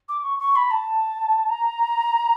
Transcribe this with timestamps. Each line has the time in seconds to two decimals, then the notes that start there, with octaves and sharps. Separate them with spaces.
0.09 D6
0.23 C#6
0.40 C#6
0.56 B5
0.71 A5
1.49 A#5